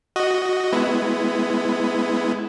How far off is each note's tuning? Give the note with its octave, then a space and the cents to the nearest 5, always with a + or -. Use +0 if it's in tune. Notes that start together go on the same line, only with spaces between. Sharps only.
F#4 +0 D#5 +0
G#3 +10 B3 +15 E4 +0